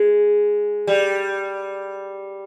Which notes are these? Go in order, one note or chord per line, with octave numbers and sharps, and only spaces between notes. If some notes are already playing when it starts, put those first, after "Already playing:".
Already playing: G#3
G3